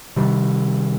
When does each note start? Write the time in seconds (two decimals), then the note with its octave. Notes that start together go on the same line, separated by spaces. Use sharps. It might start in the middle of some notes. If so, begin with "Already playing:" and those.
0.16 C3 D#3 G3